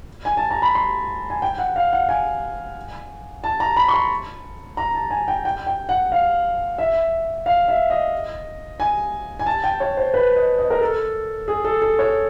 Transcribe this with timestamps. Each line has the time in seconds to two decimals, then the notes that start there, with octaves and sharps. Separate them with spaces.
0.25 G#5
0.37 A5
0.51 A#5
0.62 B5
0.75 C6
1.30 G#5
1.42 G5
1.58 F#5
1.76 F5
1.93 F#5
2.09 G#5
3.44 A5
3.60 A#5
3.77 B5
3.88 C#6
3.94 C6
4.77 A#5
4.95 A5
5.11 G#5
5.28 G5
5.45 G5
5.67 G5
5.89 F#5
6.12 F5
6.78 E5
7.46 F5
7.68 E5
7.90 D#5
8.80 G#5
9.39 G#5
9.46 A5
9.64 G5
9.80 C#5
9.97 C5
10.14 B4
10.36 D#5
10.59 D#5
10.70 A#4
10.81 A4
11.48 G#4
11.64 A4
11.82 A4
11.99 C#5